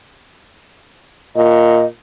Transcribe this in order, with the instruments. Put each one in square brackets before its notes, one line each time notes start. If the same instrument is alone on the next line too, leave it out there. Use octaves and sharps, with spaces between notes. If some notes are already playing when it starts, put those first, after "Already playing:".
[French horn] A#2 [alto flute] D#5